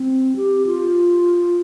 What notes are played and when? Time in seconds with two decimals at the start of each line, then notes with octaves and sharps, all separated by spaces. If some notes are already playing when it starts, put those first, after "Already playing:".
Already playing: C4
0.36 G4
0.66 F4